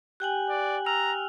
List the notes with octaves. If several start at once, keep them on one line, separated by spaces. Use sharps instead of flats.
G4 G5 G#5 F#6 F#7
D5
A#5 E6 F6 F7